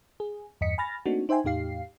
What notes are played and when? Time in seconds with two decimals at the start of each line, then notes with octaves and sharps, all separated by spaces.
0.20 G#4
0.61 E2 G2 D#5 B6 C#7
0.78 G#5 B5 F6 A6 A#6
1.06 A3 A#3 C4 D4 D#4 F#4
1.29 D#4 C5 E5 G5 G#5 C6
1.44 E2 A2 D#4 G4 F5 C7